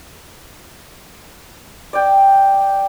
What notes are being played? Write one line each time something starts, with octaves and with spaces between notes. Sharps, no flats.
D5 G5